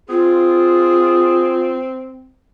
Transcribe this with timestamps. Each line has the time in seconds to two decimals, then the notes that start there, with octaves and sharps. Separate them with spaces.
0.09 C4 F4 G#4